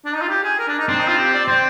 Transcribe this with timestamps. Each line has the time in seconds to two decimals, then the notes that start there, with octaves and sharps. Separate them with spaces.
0.05 D4
0.14 D#4
0.22 F4
0.29 G4
0.44 G#4
0.59 A#4
0.68 D4
0.79 D#4
0.88 C4 D4
0.99 D#4
1.08 F4
1.19 G4
1.34 D5
1.48 C4 C5